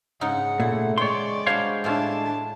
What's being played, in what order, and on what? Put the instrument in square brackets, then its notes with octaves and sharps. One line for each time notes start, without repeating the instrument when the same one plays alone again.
[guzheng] G#2 C#3 D#4 [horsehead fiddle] F#5
[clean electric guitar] A#2 [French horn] A3 [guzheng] E4
[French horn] G#3 [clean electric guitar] C#5 C6 [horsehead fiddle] D5 [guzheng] G5
[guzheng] G3 D4 F#4 [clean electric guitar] C5 C#5 F5
[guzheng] A2 E4 F4 [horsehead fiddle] D4 A5